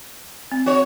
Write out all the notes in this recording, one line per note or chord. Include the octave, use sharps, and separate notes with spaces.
C4
F#4 C#5